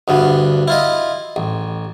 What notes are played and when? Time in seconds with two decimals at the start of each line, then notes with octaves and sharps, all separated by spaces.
0.08 D2 G2 B3
0.68 E4 F4 D#5
1.36 A1